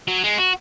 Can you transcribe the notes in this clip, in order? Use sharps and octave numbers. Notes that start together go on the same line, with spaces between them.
F#3
G#3
F#4